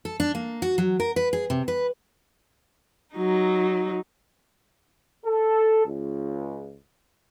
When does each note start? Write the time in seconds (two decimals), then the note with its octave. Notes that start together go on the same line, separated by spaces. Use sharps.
0.05 A4
0.20 D4
0.35 A#3
0.62 F#4
0.78 F#3
1.00 A#4
1.16 B4
1.33 G#4
1.50 C3
1.68 B4
3.15 F#3 D#4
5.26 A4
5.86 C#2